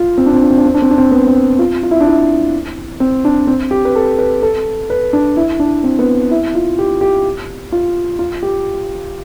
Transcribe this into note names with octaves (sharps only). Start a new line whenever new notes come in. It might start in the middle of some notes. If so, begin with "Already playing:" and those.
Already playing: F4
C4
D4
C4
D4
C4
D4
C4
D4
C4
D4
C4
B3
C4
F4
F4
E4
D4
E4
C4
D4
C4
G4
B4
A4
B4
A4
B4
D4
E4
D4
C4
B3
E4
F4
G4
G4
F4
F4
G4